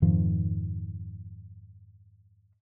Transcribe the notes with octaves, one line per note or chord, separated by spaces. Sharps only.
F2 G#2 D#3 F3